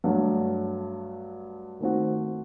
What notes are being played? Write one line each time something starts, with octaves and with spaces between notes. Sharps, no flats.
G2 F#3 A3
D#3 A3 C4 F#4